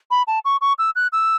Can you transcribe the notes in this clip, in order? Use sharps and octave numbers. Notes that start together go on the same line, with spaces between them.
B5
A5
C#6
C#6
E6
F#6
E6